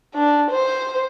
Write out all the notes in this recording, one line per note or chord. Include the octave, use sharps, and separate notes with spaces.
D4
C5